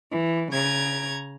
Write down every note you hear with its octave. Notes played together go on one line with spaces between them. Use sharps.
E3
C#3 A#5 G#6